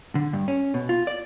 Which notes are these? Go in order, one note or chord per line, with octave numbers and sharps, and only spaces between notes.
D3
G2
C#4
B2
F4
D5